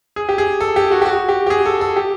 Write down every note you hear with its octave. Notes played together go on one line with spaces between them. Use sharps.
G#4
G4
G#4
A4
G4
F#4
G4
F#4
G4
G4
G#4
A4
A4
G4